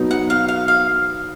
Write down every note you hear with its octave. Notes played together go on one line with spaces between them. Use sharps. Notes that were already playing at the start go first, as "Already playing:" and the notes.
Already playing: B2 F#3 B3 D#4
F#5
F5
F5
F5